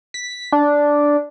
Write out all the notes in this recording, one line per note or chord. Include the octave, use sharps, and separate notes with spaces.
B6
D4